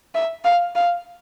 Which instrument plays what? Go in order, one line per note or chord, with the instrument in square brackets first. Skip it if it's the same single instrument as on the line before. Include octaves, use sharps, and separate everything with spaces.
[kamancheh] E5
F5
F5